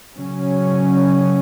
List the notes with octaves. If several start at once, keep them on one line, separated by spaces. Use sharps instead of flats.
C#3 F#3 C#4